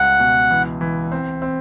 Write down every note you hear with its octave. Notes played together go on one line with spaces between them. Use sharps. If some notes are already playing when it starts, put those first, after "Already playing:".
Already playing: C#2 G3 F#5
B2
E3
E3
C4
C4